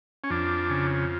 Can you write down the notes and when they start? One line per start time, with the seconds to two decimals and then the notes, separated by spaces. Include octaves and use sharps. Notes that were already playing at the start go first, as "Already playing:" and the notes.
0.24 C#4
0.30 F2 D4
0.70 C#3